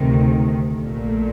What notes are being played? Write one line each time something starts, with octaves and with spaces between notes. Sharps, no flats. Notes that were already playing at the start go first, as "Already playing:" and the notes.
Already playing: D2 C3 D#3
A#1 A#2 A3